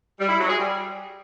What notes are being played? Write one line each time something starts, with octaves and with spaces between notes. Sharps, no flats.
G3
E4
F#3
G#4
G3